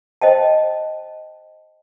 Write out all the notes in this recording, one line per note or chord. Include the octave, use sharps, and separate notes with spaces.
C5 D#5 G5 A5